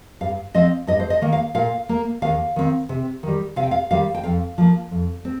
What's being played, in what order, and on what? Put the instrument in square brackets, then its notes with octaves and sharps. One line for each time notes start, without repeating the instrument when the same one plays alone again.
[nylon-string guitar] G2 F5
F3 C4 D#5
G2 D#5
C5
D#5
D#3 A#3
F5
A#2 F5
A#3
D#2 F5
D#3 C4
C3
D#3 G3
C3 F5
G5
F5
D#3 G3 F5
G5
F2 F5
F3 A#3
F2
C4